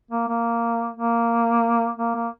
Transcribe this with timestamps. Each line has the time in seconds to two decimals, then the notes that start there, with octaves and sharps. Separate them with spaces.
0.11 A#3
0.28 A#3
0.97 A#3
1.98 A#3
2.15 A#3